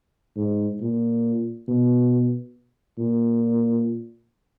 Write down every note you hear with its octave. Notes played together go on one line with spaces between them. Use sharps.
G#2
A#2
B2
A#2